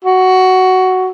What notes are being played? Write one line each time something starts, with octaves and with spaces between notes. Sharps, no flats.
F#4